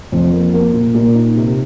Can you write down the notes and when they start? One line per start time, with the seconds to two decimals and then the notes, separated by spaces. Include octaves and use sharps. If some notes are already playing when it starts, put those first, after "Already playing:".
0.12 F2
0.33 A#3
0.54 A#3
0.74 A#2
0.94 A#2
1.15 D#4
1.36 C3